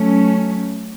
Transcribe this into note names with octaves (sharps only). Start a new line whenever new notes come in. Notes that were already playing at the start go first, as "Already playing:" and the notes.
Already playing: F#3 A3 C#4